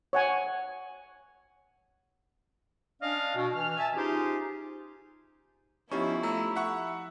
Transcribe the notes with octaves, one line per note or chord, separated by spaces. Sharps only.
C#5 F#5 G#5
C#4 D4 D5 D#5 F5
B2
E3 F6
E5 G#5 A5
C#4 D#4 F4 G4 G#4 C5
F3 B3 C#4 D#4 E4 G4 C#6
A3 A#5 B5 E6
E5 F#5 C#6